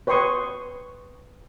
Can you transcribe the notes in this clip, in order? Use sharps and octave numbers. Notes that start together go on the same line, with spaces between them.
B4 C#5 G5 C6 C#6 D#6